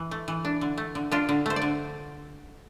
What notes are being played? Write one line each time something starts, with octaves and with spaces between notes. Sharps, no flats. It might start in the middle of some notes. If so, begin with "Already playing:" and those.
Already playing: E3
A3
E3
D4
D3
A3
D3
D4 F4
D3
A3 C5
D5
D3